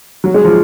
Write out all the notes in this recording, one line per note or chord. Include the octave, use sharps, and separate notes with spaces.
F#3
G#3
F3